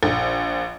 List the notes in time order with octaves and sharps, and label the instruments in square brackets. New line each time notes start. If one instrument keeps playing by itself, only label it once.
[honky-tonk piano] A#1